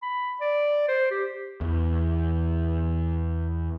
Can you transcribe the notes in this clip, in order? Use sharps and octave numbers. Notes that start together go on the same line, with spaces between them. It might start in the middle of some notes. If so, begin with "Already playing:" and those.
B5
D5
C5
G4
E2 E3